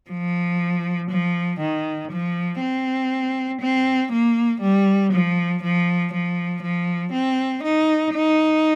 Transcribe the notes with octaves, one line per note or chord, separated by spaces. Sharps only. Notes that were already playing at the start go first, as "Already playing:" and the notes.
F3
F3
D#3
F3
C4
C4
A#3
G3
F3
F3
F3
F3
C4
D#4
D#4